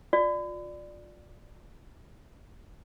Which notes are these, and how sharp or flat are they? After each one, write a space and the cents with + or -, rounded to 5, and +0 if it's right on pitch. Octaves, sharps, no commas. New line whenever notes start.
F4 +30 D5 +10